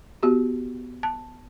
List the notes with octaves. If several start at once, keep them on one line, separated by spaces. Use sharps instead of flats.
B3 F#4 G4
A5